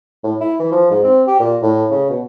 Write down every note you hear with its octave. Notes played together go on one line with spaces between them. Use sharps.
A2
E4
E3
F3
G#2
C4
G4
A#2
A2
C#3
B2